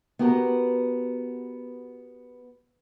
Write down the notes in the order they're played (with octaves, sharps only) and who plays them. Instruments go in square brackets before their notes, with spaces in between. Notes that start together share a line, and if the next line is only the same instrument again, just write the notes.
[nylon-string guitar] B3 F#4 G4 A#4 B4